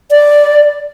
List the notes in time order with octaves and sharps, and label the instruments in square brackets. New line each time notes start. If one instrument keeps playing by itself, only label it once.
[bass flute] D5